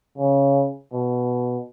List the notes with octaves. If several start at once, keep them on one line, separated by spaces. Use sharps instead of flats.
C#3
B2